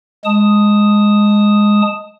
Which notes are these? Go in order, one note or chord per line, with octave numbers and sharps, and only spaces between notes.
G#3 A5 D#6